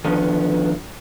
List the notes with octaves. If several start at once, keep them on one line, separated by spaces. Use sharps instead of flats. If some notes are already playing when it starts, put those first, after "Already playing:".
D3 D#3 F3 B3